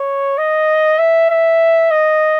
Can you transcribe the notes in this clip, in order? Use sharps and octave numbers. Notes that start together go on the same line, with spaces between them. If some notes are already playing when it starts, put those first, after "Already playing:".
Already playing: C#5
D#5
E5
E5
D#5